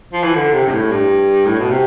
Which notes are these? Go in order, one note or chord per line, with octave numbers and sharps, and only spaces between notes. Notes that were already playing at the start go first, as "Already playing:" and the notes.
F3
E3
D3
C3
G2
A2
G2
A2
B2
C3